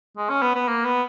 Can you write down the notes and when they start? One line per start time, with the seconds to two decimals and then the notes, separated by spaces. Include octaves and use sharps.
0.17 G#3
0.29 C#4
0.42 B3
0.55 B3
0.68 A#3
0.85 B3